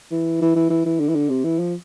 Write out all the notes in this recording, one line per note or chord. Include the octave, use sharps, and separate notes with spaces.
E3
E3
E3
E3
E3
D3
E3
D3
C3
E3
F3